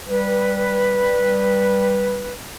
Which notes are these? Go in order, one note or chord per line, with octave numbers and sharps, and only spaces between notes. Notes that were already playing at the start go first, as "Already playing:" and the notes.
G3 B4